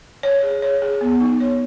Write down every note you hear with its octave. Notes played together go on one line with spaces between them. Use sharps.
C#5
G#4
C#5
G#4
B3
D#4
C#5